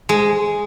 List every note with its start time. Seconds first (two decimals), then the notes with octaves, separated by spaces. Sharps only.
0.09 G#3